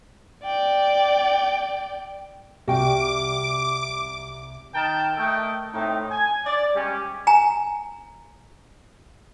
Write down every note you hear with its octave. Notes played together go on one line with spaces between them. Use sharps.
D5 G5
C2 F#4 G4 G5 D6
D#3 A#4 G5 A5
A3 A4 A#4 D#5 G5
A2 A3 C4 D#4
G#5
D5
G3 G#3 C#4 G4
G#5 A#5